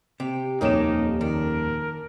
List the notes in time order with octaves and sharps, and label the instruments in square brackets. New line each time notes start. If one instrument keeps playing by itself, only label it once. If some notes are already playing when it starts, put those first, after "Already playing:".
[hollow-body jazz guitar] C3 [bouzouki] G4
[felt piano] D#1 F2 E7 [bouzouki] A#3 C#4 G4 [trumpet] D#4
[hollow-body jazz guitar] D#3 [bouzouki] D4 [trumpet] A#4